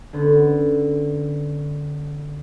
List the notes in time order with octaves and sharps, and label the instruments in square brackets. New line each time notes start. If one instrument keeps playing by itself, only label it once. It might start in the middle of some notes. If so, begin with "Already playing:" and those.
[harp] D3 B3 C#4